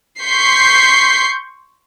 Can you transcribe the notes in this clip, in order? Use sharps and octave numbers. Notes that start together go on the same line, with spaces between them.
C6 C#6 G6 B6 C7